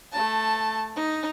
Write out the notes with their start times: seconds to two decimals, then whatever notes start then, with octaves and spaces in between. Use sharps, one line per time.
0.12 A3 A5
0.96 D#4